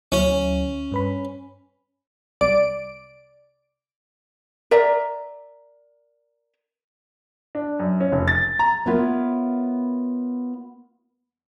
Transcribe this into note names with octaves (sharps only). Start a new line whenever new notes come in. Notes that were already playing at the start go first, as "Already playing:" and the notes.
D2 F#3 C#4 E4
G2 B4 B5
C2 D5 D7
A#4 D5 E5 A#5
D4
F#2
C#4
F1
A6
A#5
B3 E4 F4 A#4 C#5